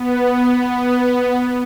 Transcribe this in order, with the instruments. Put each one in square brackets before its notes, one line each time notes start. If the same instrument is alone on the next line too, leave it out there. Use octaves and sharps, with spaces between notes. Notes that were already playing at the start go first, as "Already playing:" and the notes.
Already playing: [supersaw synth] B3